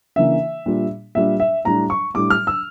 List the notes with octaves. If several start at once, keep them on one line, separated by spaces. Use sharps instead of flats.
C#3 E3 A#3 D4 E5
A#2 G3 D4
A#2 G3 D4 E5
E5
A2 G3 D4 A#5
C#6
A2 G3 D4 D6
F6
E6